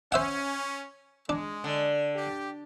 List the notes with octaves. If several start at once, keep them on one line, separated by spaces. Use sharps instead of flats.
C#4 C5 E5 F#5
G#3 D4
D3
G4